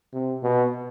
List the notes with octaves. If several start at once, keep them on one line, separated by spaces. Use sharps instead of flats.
C3
B2